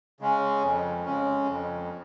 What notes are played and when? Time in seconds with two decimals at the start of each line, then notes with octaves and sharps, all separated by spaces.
0.20 C#3 G#3 C#4
0.63 F2
1.05 C#3 G#3 C#4
1.48 F2